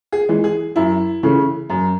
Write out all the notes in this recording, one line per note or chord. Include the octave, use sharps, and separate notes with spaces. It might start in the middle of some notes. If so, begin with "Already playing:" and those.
G#4
E3 G#3
G#4
F#2 E4
C#3 E3 A3
F#2